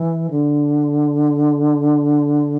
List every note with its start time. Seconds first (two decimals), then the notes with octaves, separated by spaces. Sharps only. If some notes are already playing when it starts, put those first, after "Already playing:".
Already playing: E3
0.31 D3